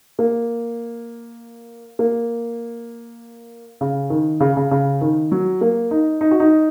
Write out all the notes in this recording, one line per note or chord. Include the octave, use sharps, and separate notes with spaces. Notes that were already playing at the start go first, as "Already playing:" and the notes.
A#3
A#3
C#3
D#3
C#3
C#3
C#3
D#3
F#3
A#3
D#4
D#4
F#4
D#4